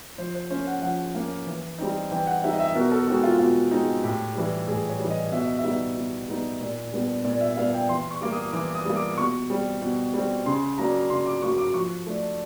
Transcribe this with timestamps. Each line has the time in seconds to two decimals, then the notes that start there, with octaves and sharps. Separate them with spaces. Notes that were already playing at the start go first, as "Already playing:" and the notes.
0.18 F3 C5
0.35 C5
0.50 A#3 C#4 C5
0.67 F#5
0.82 F3 F#5
1.15 A#3 C#4
1.47 E3
1.78 G3 C4 D#4
2.11 E3 G5
2.27 F#5
2.44 G3 C4 D#4 E5
2.53 D#5
2.60 E5
2.75 B2 A#4
2.91 A4
3.07 G#3 C4 D#4 F#4
3.23 F4
3.39 B2 F4
3.71 G#3 C4 D#4
4.03 A2 G4
4.36 E3 G3
4.68 A2 G#4
4.89 C#5
5.00 E3 G3
5.10 D#5
5.32 B2 E5
5.45 D#5
5.59 E5
5.64 G3 B3 D#4
5.96 B2
6.29 G3 B3 D#4
6.61 A#2
6.93 G3 B3 D4
7.25 A#2 D5
7.41 E5
7.57 G3 B3 D4 F5
7.73 G5
7.89 E3 C6
8.11 C#6
8.21 G3 A#3 D6
8.32 D#6
8.53 E3 D6
8.75 D#6
8.85 G3 A#3
8.96 D6
9.17 B2 C#6
9.50 G3 C4
9.82 B2
10.14 G3 C4
10.46 C#3 C6
10.78 F#3 A#3 D4 A#5
11.10 C#3 C6
11.26 D6
11.42 F#3 A#3 D4 C#6
11.58 D6
11.74 F3 C#6
12.06 A3 D4